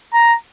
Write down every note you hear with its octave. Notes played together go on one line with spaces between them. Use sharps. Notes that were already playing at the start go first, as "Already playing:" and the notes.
A#5